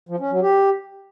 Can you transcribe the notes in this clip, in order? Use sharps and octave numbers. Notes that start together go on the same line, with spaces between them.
F3
C#4
F#3
G4